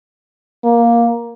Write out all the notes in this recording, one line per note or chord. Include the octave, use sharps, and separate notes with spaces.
A#3